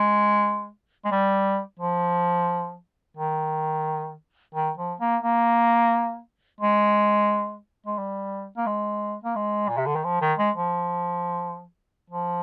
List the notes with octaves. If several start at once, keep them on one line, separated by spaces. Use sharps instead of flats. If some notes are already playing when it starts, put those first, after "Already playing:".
Already playing: G#3
G#3
G3
F3
D#3
D#3
F3
A#3
A#3
G#3
G#3
G3
A#3
G#3
A#3
G#3
A#2
C3
D3
D#3
F3
D#3
G#3
F3
F3